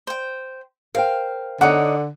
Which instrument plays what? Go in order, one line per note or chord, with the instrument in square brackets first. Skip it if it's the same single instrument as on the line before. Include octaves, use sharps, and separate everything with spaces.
[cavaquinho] C5 G5
[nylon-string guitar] A#4 C5 G5 [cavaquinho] F5
[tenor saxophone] D3 [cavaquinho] D#4 C#5 D6 [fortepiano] F#5